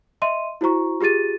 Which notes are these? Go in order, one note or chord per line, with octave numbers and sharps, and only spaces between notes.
D#5 E5 C6 D#7
E4 F#4 C5 A#5 C#6
F4 G4 G#4 A6 D#7